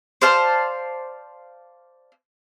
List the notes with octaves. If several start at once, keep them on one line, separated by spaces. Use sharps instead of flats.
C5 D5 F5 A5